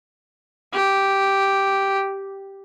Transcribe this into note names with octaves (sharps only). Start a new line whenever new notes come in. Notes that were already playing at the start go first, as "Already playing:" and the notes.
G4